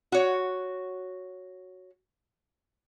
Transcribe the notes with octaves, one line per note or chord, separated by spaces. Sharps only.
F#4 C#5